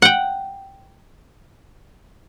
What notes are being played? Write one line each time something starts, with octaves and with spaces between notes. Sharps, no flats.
F#5 G5